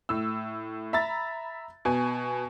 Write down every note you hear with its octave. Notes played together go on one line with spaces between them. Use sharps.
A2 E6
E5 A#5 B5 A6
B2 G#5